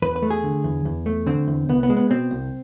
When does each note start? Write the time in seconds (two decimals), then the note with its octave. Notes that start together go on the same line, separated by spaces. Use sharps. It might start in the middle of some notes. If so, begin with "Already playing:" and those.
0.02 E2 B4
0.16 B4
0.23 A3
0.30 G#4
0.44 D3
0.64 E2
0.85 E2
1.06 A3
1.26 D3 C4
1.47 E2
1.69 C2 B3
1.83 B3
1.90 G#3
1.97 B3
2.10 B2 C4
2.31 C2